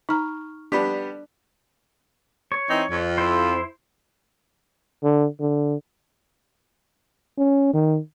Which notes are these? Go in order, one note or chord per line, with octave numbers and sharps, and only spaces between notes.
D#4 A#5 C#6 F6
G3 B3 D4 G4 B5 B6
C#5
E3 C4 D#4
F2
E4 C5
D3
D3
C#4
D#3